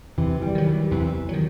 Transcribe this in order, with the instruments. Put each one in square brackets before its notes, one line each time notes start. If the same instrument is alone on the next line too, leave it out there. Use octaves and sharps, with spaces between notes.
[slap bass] E2 [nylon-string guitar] C3 E3
[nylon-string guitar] E3 G3
[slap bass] D#3 F#3
[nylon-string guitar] E3 G3
[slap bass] E2 [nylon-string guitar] C3 E3
[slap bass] D#3 F#3